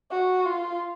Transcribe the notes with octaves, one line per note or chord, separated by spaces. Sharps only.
F#4
F4